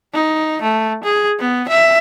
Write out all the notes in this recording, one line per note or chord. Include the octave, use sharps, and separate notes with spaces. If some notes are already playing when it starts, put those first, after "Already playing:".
D#4
A3
G#4
B3
E5